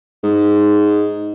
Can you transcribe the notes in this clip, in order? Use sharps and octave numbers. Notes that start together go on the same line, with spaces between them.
G#2